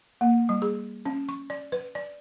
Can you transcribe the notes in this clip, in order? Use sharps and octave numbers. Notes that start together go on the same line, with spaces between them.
A#3
G3
G#4
C#4
C#6
D5
B4
D5